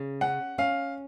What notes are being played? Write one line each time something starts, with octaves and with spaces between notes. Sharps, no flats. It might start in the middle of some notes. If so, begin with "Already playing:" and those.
Already playing: C#3
C#4 F#5
C#4 F5